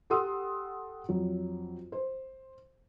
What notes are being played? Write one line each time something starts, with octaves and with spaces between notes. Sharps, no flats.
G4 A4 F#5 C6 D#6 E6
F2 F#3
C5